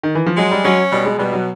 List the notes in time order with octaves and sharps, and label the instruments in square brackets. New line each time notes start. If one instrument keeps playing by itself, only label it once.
[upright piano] D#3
E3
F3
[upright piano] F#3 [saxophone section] G#3
[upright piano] G3
[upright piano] F#3 [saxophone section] C#4
[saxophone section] B2 [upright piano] G3
[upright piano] G#3
[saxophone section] B2 [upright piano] G3
[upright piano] F#3